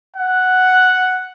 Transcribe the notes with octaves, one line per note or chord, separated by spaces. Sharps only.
F#5